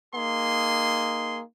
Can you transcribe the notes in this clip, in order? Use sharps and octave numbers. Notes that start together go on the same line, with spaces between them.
A#3 D#4 G#4 C6